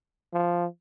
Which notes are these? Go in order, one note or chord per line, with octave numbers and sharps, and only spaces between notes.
F3